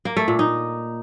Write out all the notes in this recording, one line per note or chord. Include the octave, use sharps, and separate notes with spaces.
A#3
A3
A#2
D#4